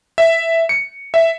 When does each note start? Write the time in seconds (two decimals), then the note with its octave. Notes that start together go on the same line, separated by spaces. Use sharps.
0.18 E5
0.69 C#7
1.14 E5